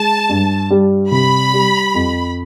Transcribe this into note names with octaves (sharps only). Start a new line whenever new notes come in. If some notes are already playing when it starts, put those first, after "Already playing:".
Already playing: G#3 A5
G2
G3
C3 B5
G3
F2